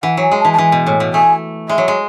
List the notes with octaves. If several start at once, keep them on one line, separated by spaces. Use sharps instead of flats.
E3 F#5
F#3 G#5
G#3
A5
E3
A5
E3 G#5
B2
A2
B2
A3 G#5
G#3 E5
F#3
G#3